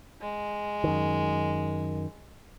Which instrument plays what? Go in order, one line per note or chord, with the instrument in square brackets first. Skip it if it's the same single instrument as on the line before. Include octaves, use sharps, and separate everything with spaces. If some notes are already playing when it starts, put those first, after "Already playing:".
[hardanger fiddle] G#3
[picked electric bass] F#2 D#3